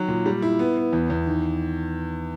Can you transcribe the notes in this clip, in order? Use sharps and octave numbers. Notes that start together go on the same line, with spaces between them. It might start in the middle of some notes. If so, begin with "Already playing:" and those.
Already playing: D#3 F#3
A#2
G3
E4
B3
B3
E2
E2
D#3